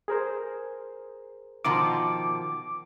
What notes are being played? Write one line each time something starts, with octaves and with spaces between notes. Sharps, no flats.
G#4 A#4 C5
B2 D#3 F3 D6